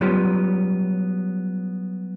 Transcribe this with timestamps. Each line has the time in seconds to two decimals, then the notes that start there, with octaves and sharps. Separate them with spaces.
0.01 F#3 G3 B3 C#4 F4 G4